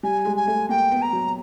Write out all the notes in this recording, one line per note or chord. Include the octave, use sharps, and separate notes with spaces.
G3 G#5
G#3
G#5
A3
A#3 G5
B3
A#5
F#3